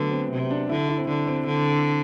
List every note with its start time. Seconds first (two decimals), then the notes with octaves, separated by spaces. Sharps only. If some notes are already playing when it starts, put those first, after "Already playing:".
Already playing: D3 F#3 A3 B3
0.11 C4
0.32 C3
0.51 D4
0.69 D3 E4
0.89 E4
0.98 C4
1.08 D3 D4
1.27 C4
1.47 D3